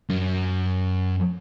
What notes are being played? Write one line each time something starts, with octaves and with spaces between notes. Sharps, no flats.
F#2